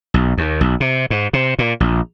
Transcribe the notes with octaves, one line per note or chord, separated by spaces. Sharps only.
B1
D#2
B1
C3
G#2
C3
A#2
A#1